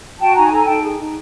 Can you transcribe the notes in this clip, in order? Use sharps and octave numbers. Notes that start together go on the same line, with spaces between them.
F#4 G5 A5
D#4 G#5 A#5
A4 G#5 A#5
D#4 G5 A5
G#4
D#4